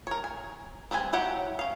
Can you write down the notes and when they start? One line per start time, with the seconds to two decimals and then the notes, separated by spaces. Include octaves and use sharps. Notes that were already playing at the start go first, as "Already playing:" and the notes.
0.07 A#4 C#5
0.24 G#5
0.91 G3 C4 B4 G#5
1.13 F#3 E4 G4 F#5
1.59 C#4 F5